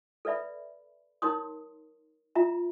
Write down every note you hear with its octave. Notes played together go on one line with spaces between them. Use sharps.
A4 B4 D5 E5 B5
D#4 A#4 C#5 C6 D#6
F4 E5 A#5